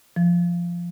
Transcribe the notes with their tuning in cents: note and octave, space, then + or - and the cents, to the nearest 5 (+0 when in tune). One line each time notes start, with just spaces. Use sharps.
F3 -5